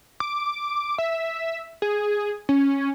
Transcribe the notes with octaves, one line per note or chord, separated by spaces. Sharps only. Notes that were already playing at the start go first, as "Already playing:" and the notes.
D6
E5
G#4
C#4